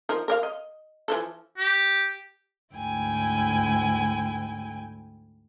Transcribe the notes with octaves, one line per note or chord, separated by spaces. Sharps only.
F3 D#4 A#4
A#4 D5 F5
D#5
E3 F3 A4
G4
D2 G#2 E4 G5 G#5